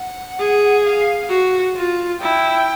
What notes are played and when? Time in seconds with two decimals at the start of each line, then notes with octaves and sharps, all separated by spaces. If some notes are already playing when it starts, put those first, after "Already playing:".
Already playing: F#5
0.39 G#4
0.84 F5
1.30 F#4
1.76 F4
2.21 E4 G5